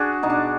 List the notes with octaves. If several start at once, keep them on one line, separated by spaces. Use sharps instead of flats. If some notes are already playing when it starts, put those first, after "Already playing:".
Already playing: D4 F#4 G#4
B2 D#4
D4